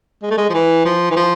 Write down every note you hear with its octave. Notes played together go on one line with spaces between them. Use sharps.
G#3
A3
G#3
F3
E3
F3
E3
F3